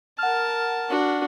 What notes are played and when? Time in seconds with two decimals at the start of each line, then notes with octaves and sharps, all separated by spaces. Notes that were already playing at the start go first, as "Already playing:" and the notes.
0.19 A#4 F#5 A5 F6
0.89 D4 F#4